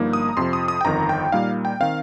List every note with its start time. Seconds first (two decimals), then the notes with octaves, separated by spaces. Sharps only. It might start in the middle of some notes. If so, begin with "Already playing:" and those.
Already playing: G1 G2 F3 A#3 D#4
0.13 D#6
0.29 A#5
0.37 F2 C3 F3 C6
0.53 D#6
0.68 D#6
0.81 G5
0.85 G1 F2 D#3 A#5
1.09 G5
1.32 A#2 G3 A#3 D#4 F5
1.65 G5
1.80 D#3 C4 F5